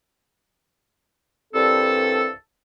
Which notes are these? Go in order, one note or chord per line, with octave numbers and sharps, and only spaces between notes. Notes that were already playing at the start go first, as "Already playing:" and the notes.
C2 G2 C4 A4